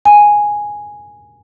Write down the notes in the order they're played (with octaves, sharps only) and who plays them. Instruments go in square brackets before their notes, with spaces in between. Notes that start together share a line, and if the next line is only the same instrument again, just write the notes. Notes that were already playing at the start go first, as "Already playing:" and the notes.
[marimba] G#5